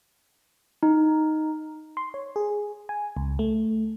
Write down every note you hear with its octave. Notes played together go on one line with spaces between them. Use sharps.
D#4
C6
C#5
G#4
G#5
C#2
A3